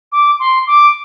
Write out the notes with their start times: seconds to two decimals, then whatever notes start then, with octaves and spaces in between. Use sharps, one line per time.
0.12 D6
0.40 C6
0.67 D6